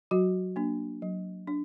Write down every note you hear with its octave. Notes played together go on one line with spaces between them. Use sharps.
F#3 F#4
A#3 D4
F#3
D4